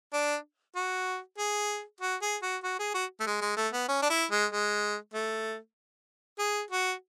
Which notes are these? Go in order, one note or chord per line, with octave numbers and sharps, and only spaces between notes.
D4
F#4
G#4
F#4
G#4
F#4
F#4
G#4
F#4
A3
G#3
G#3
A3
B3
C#4
D4
E4
G#3
G#3
A3
G#4
F#4